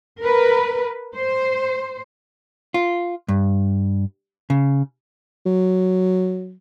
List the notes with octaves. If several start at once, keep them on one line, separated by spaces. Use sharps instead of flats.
A#4 B4
C5
F4
G2
C#3
F#3